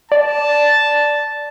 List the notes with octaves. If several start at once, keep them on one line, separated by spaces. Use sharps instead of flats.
D5 A5